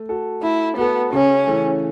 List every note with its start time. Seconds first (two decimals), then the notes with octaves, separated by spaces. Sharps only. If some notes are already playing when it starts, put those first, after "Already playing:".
Already playing: A3
0.09 F#4 A4
0.42 A3 E4
0.77 B3 F#4 A4
1.12 C#3 C#4
1.47 E3 A3